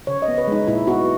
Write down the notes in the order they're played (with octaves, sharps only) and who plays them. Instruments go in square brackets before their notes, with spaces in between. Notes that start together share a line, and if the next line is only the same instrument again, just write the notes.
[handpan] C#3 C#5
D#5
B3
B4
G#3 D#4
A#2 E4
B3 F#4